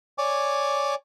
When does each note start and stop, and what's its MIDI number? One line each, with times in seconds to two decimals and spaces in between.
0.18 0.95 73
0.18 0.95 74
0.18 0.95 80
0.18 0.95 86